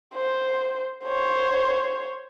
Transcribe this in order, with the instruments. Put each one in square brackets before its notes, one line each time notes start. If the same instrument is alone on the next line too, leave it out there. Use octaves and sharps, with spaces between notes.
[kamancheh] C5
C5 C#5